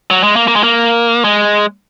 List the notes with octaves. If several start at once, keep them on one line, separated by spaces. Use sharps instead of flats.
F#3
G#3
A#3
A#3
G#3
A#3
G#3